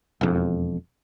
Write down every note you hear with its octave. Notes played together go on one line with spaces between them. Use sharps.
E1 F2